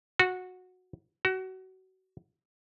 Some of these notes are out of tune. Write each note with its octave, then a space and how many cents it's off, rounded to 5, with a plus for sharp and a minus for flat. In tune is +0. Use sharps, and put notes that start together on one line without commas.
F#4 -15
F#4 +25